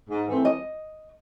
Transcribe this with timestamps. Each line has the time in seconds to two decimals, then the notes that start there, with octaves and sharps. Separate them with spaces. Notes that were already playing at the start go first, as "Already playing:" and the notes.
0.10 G#2
0.28 E3 A3 C4
0.45 D#5